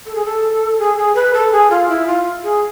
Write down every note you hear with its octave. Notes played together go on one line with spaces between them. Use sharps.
A4
G#4
A4
G#4
G#4
B4
A4
G#4
F4
E4
F4
G#4